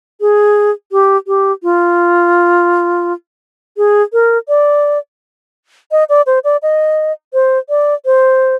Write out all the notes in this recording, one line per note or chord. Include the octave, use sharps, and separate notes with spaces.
G#4
G4
G4
F4
G#4
A#4
D5
D#5
D5
C5
D5
D#5
C5
D5
C5